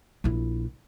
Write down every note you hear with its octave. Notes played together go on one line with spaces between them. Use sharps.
A#1 E4